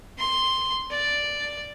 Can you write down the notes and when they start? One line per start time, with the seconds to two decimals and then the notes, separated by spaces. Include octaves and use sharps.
0.18 C6
0.91 D5